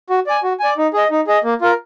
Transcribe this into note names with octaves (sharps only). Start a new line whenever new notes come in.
F#4
D5 G#5
F#4
D5 G#5
D#4
G#4 D#5
D#4
G#4 D#5
A#3
F4 A#4